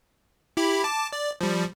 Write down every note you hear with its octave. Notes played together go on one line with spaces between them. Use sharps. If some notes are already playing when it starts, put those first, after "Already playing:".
E4 G4 B5
A5 D6
D5
F3 G3